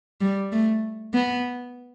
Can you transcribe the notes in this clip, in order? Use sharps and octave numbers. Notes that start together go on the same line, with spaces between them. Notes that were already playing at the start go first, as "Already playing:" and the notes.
G3
A3
B3